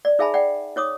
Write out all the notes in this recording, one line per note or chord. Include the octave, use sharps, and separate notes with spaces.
D5
D#4 G#4 E5 G#5 A5 B5
D5 F#5 G5
D#4 C#5 D6 D#6